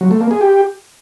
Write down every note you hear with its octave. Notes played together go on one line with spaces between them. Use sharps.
F#3
A3
A#3
G#4
G4